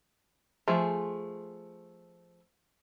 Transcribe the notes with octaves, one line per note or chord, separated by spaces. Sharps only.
F3 A3 G#4